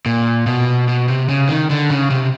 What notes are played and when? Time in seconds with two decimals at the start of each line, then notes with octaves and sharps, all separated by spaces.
0.06 A#2
0.46 B2
0.88 B2
1.08 C3
1.29 C#3
1.49 D#3
1.70 D3
1.90 C#3
2.10 C3